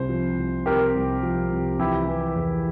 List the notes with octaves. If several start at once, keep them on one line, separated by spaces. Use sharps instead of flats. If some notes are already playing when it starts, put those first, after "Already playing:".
Already playing: C2 C3 C5
F3
C2
C3 G4 A#4
C2
F3
C2
E3 E4 G4
E3
E2